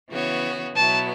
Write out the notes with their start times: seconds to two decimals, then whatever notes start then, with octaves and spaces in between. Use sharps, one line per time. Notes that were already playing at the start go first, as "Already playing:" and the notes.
0.10 C#3 E3 B3 F#4 C#5
0.76 B2 F#3 B3 E4 A5